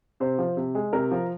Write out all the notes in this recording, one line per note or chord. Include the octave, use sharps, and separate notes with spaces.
C3 C5
F3
C3
G#3
C3 A#4
F3